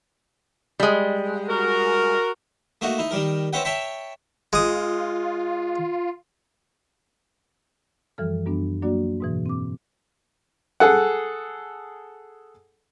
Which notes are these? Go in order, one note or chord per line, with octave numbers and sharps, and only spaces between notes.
G3 G#3
F#4 A#4
A3 A#3 D#4 F#4
D#4 E4
D#3 G3 A#4
C4 C#4 B4 E5 F#5 G5
C#5 E5 G5 A5 B5 C#6
G#3 F4 D#6
F#2 E3 F3 G3 A4 F6
F#2 G3 B3 D4
F#3 A#3 D4 F#4 D5
G#2 B2 E3
C4 D6
G#4 A4 F#5